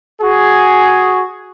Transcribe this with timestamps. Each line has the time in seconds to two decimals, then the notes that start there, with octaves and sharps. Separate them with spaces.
0.21 F#4 G#4